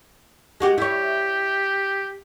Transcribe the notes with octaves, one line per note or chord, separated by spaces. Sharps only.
G#3 F#4 G4
E4 G4 C#5